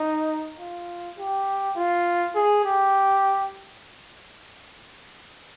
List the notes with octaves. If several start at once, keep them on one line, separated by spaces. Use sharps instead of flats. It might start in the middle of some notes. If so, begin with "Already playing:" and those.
Already playing: D#4
F4
G4
F4
G#4
G4